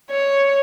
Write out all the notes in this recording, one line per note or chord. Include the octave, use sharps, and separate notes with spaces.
C#5